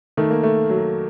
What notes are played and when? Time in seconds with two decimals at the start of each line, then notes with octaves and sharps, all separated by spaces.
0.17 D#3 A3
0.31 A#3
0.43 A3
0.69 F#3